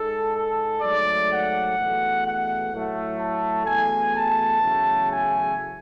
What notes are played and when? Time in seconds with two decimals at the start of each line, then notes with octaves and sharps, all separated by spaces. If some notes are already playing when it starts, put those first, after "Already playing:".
Already playing: G#2 G#3 A4
0.35 A4
0.82 G#2 F#3 A3 D5
1.30 F#5
1.77 E2 B2 A3
2.24 F#5
2.72 A2 F#3 A3
3.20 A5
3.67 E2 B2 A3 G#5
4.14 A5
4.62 E2 C#3 F#3 A3
5.09 G#5